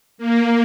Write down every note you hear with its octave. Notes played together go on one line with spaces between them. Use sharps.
A#3